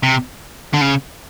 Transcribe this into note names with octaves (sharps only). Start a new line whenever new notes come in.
C3
D3
C#3